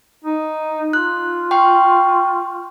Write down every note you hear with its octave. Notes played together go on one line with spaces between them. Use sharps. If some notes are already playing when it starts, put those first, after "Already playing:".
D#4
F4 F#6
G5 C6 C#6